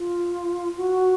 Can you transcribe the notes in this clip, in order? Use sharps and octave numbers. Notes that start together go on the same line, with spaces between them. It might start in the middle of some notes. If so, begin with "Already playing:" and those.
Already playing: F4
F#4